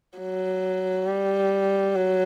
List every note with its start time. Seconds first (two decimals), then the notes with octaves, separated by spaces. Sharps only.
0.18 F#3
1.07 G3
1.95 F#3